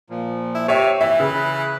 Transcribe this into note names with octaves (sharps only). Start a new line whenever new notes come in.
A#2 F3
E4
C3 G4 C#5 E5
E3 E5
C#3 B4